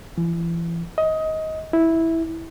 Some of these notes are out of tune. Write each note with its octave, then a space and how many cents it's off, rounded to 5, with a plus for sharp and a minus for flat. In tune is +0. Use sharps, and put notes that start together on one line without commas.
E3 +35
D#5 +20
E4 -10